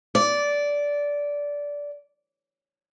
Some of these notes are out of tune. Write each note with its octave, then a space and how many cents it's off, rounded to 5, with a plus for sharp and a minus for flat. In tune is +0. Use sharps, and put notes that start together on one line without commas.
D5 -15